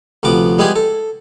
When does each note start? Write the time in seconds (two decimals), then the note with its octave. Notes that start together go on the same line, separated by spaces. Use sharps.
0.23 D2 C3 F3 B3 D6
0.58 G3 G#3 B3 E4 G4 G#4
0.76 A4